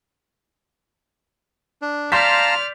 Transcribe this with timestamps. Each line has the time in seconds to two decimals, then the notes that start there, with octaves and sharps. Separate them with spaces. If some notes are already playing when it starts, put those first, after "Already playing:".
1.82 D4
2.12 D5 F5 A5 A#5 C6 F6 G6 B6